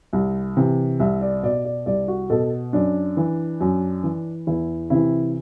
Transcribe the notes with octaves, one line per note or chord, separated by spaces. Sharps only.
C2
C3 E3
C2 E5
D5
B2 D5
D5
C2 D5
F#4
B2 A4
F#2 D4
E3
F#2
E3
E2 E4
C3 E3 E4